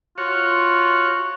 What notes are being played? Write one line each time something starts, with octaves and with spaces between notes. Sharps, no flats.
F4 F#4 C#5